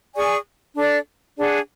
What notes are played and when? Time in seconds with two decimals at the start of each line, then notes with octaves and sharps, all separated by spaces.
0.15 G#4 D5 G#5 C#6
0.76 D4 A4 D5
1.37 D4 G#4 D5 F#5